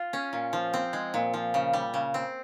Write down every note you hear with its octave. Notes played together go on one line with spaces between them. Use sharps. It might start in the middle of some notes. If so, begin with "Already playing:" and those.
Already playing: F4
C#4
A#2
F3
C4
G#3
A#2
F3
C#3
G3
C#3
C4